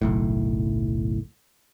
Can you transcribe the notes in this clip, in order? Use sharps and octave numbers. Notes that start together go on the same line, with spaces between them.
F#1 B1 A2